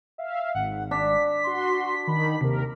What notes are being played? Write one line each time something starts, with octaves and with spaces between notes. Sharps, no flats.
E5 F5
G#1 F#5
D4 B6
F#4 C6
D#3 B5
D#2 C3 A#4